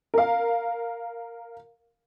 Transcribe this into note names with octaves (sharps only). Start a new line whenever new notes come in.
A#4 F5